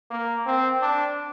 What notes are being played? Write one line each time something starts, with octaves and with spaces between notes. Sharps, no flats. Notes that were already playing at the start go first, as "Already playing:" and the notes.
A#3
C4
D4